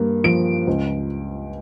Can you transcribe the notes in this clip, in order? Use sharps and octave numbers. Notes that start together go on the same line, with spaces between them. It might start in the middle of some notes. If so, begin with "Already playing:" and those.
Already playing: G2 A#3
F3 D7
C#2